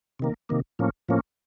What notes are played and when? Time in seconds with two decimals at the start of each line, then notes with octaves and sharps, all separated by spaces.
0.19 C3 D#3 A#3
0.49 C3 D#3 A#3
0.79 A2 F3 A#3 C#4
1.09 A2 F3 A#3 C#4